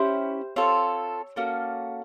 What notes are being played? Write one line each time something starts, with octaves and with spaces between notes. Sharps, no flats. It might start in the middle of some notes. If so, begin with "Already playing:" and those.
Already playing: C#4 E4 G4 C5
C4 F4 A4 C#5
A#3 C#4 F#4 A4